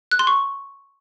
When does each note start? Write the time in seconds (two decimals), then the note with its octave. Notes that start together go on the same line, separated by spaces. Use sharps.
0.11 F#6
0.19 C6
0.27 C#6